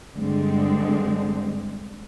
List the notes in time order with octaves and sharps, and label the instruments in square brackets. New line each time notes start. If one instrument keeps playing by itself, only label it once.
[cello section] G2 D3 G#3 C4